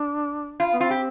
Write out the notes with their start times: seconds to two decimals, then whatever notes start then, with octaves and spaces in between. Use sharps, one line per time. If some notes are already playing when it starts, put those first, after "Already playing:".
Already playing: D4
0.60 F4
0.73 B3
0.80 C4 F4
0.90 G4